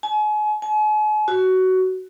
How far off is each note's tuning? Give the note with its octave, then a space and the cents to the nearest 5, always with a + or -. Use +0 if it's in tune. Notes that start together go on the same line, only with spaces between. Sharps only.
G#5 +35
G#5 +45
F#4 +15